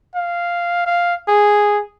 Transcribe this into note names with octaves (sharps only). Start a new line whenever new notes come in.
F5
F5
G#4